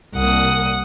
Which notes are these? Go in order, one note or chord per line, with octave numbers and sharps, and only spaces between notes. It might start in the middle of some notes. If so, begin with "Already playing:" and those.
C2 A#3 F#5 D#6